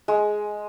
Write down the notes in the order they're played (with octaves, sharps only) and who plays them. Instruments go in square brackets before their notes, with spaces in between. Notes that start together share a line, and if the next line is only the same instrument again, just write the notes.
[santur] G#3